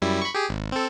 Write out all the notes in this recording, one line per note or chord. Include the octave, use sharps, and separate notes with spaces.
F#2 G3 E4
B5 C#6
G4 G#4
G#1
C4 A4